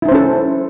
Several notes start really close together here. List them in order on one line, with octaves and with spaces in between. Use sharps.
E4 D#4 C5 C#4 A4